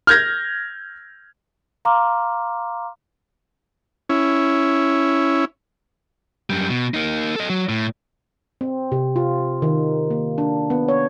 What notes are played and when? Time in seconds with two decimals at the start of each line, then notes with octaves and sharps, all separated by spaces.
0.07 F6 G6 G#6 A#6
1.85 F5 A#5 C6 D6 F6
4.09 C#4 E4
6.50 F#2 G3
6.70 B2
6.94 A#3 D#4
7.36 A4 D#5
7.50 F#3
7.69 A2
8.61 C4
8.92 C3
9.16 F4
9.62 D#3
10.11 A#3
10.38 D4
10.70 B3
10.88 C#5